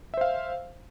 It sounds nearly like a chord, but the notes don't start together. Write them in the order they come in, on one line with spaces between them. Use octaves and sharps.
E5 C5 F5